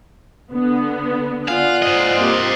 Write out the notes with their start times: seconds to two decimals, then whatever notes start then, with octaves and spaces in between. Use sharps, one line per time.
0.53 D3 B3
1.48 F4 D5 F5 F#5 G#5 F#6
1.83 C5 D#5
2.17 A#3 C4 G4